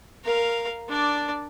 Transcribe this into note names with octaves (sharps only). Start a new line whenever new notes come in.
A#4 F5
D4 D5